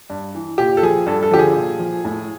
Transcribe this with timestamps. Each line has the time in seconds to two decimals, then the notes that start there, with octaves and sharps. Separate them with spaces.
0.10 G2
0.35 E3
0.58 A#2 G4
0.77 A4
0.83 F3 G#4
1.06 G2 A4
1.23 A4
1.31 D3 F3 G4
1.39 G#4
1.56 A#2
1.79 F3
2.05 A2